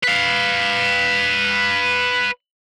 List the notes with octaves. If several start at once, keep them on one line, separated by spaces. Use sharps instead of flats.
B4 F5